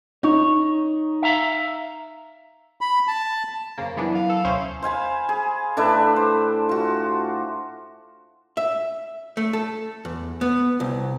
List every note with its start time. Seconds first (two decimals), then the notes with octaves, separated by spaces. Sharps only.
0.23 D#4 C#5
1.22 E5 F5 A#5
2.81 B5
3.07 A5
3.78 F#2 C#3 A#3 C5
3.97 E3 F#3 B3 D4 E4
4.14 F5
4.30 A4
4.44 D2 B2 C#4 E4 C5 D#6
4.83 C5 F5 G#5 B5
5.29 G#4
5.77 A2 D4 B4 E5
6.16 C5
6.69 F4 F#4
8.57 E5
9.37 A3
9.53 A4
10.05 E2
10.41 B3
10.80 C2